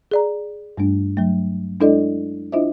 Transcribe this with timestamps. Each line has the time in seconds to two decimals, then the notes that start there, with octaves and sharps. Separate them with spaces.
0.11 G#4 D5 A#5
0.77 G2 G3 A3 D4
1.17 F#3 A3
1.80 G#3 D4 E4 A4 D5 D#5
2.52 D4 E4 F4 C5 D#5 E5